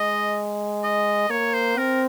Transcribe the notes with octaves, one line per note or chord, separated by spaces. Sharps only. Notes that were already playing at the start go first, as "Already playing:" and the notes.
Already playing: G#3 D#5
D#5
A#3 C#5
C5
C4 A#4